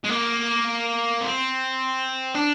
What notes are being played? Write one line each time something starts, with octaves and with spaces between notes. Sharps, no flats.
G#3
A#3
C4
D4